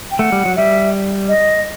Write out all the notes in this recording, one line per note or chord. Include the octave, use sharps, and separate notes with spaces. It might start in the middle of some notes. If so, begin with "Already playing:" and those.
G5
A3 F#5
G3
F#3
G3 E5
D#5